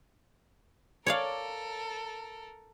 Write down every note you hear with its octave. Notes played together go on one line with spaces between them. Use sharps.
A4 A#4 C#5 D5 F5